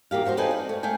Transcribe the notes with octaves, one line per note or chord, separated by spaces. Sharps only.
E2 A#3 G4 F5
C4 F#4 A#4 C5
C4 D#4 A4 B4 D5 G#5
D5
A3
A3 F5 G5 G#5